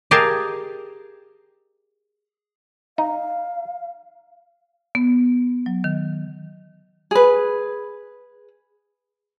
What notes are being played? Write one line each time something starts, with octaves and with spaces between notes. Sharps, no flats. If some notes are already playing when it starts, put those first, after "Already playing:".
G4 G#4 A#4 D#5 F5 A5
D#4 F5
B3
F#3
D#3
G#4 B4